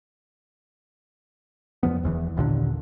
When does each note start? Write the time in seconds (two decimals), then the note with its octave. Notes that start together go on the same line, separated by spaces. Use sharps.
1.83 E2 F3 B3
2.03 E1 E2 D#3 E3
2.36 A1 D#2 A#2 D3